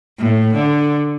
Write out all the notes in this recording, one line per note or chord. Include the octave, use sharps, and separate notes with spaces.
A2
D3